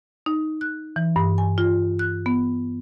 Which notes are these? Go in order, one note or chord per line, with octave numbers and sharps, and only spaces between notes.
D#4
F#6
E3
G2
G#5
F4
F#6
B3